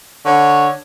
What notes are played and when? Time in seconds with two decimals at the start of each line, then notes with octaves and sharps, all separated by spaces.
0.25 D3 C#5